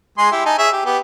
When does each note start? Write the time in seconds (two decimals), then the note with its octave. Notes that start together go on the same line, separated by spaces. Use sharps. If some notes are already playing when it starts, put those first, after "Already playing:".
0.18 G#3 G#4 C6
0.32 E4 G4
0.46 D#4 G#5 A5
0.58 G#4 C#5 E5
0.73 G4
0.86 B3 G4